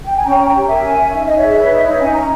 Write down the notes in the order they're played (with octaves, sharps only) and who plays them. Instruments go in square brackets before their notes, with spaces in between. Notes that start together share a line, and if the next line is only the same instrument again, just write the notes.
[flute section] G5
G#5
C#4 G5 A#5
C#4
G5 A#5
G4
A#4 E5 G#5
C#4
C#4
D#4 E5
D#4 D#5
G#4 C#5 E5
B4
D#4
D#4
C#4 G#5
C#4 A#5